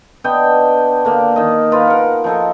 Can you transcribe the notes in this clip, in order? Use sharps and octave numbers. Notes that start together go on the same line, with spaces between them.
B3 D4 D#5 G5
D3 A#3
D#3 D#5
F4 A#4 B4
A#4 F#5
F3 D#4 A4